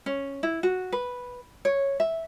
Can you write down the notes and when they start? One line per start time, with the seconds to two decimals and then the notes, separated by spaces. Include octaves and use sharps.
0.06 C#4
0.43 E4
0.63 F#4
0.92 B4
1.65 C#5
2.00 E5